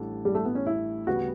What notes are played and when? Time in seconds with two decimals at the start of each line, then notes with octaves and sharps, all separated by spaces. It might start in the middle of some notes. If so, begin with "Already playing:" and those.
Already playing: A1 A2 G3 D4 A4
0.25 G3
0.35 A3
0.45 B3
0.55 C#4
0.67 E4
1.07 D2 C#3 G3 B3 F#4